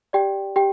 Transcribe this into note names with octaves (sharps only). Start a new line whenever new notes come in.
G4 D5 G5
G4 G5